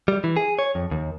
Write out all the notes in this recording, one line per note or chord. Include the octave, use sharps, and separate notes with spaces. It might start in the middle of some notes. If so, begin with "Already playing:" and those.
G3
E3
G#4
C#5
F2
D#2